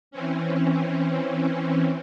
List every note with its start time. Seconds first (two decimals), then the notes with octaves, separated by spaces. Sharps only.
0.11 E3 C4 C#4